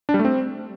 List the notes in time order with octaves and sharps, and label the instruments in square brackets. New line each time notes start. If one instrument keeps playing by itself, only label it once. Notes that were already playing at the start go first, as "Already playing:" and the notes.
[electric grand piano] D4
G3
A3
C4